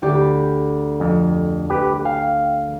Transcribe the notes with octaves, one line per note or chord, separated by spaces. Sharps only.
D2 G4 D5
B5
F2
G4 B4
F5 G5